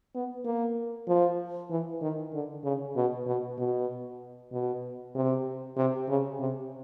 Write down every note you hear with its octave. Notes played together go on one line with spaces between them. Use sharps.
B3
A#3
F3
E3
D#3
D3
C#3
B2
B2
B2
B2
C3
C3
C#3
C3